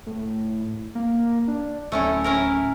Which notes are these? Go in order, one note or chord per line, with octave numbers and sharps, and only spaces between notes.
A2
A#3
D4
D1 A3 C#4 E4
C#4 E4 A#4